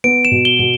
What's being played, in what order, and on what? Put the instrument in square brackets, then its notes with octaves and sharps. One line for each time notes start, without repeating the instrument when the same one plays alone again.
[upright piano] B3 [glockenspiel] D7
[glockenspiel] E7
[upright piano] B2
[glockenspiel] G7
[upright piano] B2